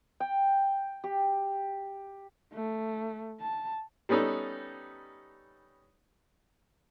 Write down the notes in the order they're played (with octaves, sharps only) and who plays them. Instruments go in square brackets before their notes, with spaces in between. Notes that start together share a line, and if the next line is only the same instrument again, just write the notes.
[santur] G5
G4
[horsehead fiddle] A3
A5
[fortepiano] G3 B3 C#4 D#4 A4